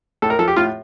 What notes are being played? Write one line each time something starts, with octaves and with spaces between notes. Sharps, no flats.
A2 A4
A#4
F3 A4
G4
A2 F4